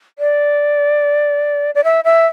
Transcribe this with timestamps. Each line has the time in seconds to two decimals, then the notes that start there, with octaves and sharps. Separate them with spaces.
0.19 D5
1.75 D5
1.84 E5
2.04 E5